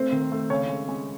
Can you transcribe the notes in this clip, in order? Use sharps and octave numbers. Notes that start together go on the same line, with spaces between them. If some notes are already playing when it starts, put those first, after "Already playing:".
Already playing: A3 C4 C5
D#3
A3
C#3 C#4 C#5
G#3
G#3